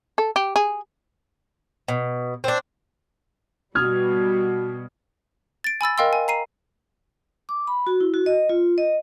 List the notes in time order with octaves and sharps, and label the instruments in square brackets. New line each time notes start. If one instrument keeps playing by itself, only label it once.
[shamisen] A4
G4
G#4
[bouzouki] B2
C4 D4
[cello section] B2 G3 [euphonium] F#4 [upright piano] D#6 F6 G#6
[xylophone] A6 D7
G#5 B5 E6 A6
A#4 D#5 F5 G5 C6 E6
G#5
A#5 C7 D#7
[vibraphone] D6
B5
F#4
E4
F#4
D#5
F4
D#5